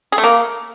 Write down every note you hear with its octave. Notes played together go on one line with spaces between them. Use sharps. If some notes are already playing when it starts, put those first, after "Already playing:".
G#4
A3
A#3